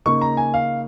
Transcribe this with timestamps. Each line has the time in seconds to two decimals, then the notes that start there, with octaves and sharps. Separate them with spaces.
0.06 C#3 A#3 D#4 C#6
0.21 A#5
0.37 G#5
0.54 F5